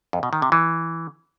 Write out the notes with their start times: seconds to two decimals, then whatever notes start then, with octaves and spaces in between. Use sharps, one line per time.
0.13 F2
0.23 B2
0.33 D#3
0.42 C3
0.52 E3